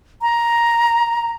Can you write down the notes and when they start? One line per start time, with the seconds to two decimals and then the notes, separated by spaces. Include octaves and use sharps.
0.22 A#5